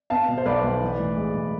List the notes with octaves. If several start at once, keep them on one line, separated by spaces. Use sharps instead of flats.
B3 F5 A5
B2
C5
B1 B4 D5
B1
E3
A2
G#3
B1